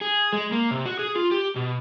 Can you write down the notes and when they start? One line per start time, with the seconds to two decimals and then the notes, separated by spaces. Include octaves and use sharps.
0.01 G#4
0.33 G#3
0.52 A#3
0.71 C3
0.85 F#4
0.99 G#4
1.16 F4
1.31 G4
1.56 B2